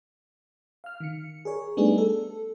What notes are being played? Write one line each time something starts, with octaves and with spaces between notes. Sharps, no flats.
F5 F6
D#3 C#7
G#4 A#4 C#5
G3 A3 B3 D4 D#4 G#4
A4